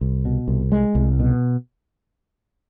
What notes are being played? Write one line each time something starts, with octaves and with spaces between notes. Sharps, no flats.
C2
B2
C2
G#3
C2
B2